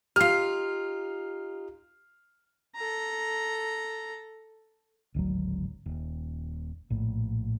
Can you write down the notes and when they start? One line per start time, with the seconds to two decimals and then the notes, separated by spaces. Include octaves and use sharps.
0.16 D#4 F4 G4 F6 C7
2.75 A4 A#5
5.14 D1 G#1 D2 F#3
5.86 D#1
6.90 A#1 A2